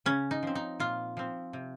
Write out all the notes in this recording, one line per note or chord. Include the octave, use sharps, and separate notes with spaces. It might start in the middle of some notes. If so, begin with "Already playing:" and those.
C#3 C#4
D#4
F3 C4
D#4
A#2 F4
F3 C4
C3